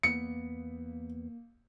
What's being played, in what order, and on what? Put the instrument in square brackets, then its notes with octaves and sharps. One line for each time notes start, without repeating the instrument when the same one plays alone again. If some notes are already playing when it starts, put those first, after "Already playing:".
[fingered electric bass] E2 B3 [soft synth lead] A#3 [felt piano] C#7